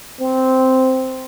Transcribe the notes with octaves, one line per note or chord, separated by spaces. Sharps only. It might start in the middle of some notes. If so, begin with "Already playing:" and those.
C4